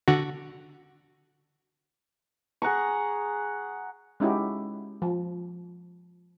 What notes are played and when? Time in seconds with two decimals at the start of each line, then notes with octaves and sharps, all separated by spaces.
0.08 D3 F#4
2.62 G#4 F#5 A#5 C#6
4.20 G#3 C#4 D#4 E4 F#4 G4
5.02 F3